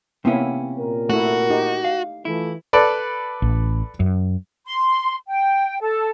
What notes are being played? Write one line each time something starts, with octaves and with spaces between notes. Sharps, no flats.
C3 A#3 B3 C#4 E4
A#2 A#4
A3 E4 F#4
D#4 G4
F5
E3 A3 E4 F4
A4 B4 D5
A1
F#2
C6
G5
A4